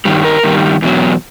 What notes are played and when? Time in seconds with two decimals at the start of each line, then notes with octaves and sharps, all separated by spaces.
0.05 G2 D#3 G3
0.24 A#4
0.43 G2 D#3 G3
0.82 E2 B2 F#3